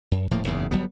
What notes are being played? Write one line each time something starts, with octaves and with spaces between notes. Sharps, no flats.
F#2
D#1 A2 F3 A#3
F#1 E2 G#2 C#3
G1 F#3 G3 B3